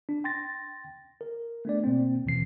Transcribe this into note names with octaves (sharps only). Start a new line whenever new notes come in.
D4
G5 C6 A6 A#6
A#4
A3 B3 D4 D5
B2 A#3 C4
D#2 B2 E3 C7